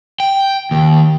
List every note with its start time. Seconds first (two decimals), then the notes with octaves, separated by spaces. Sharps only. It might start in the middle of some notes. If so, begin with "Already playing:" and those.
0.20 G5
0.71 D#2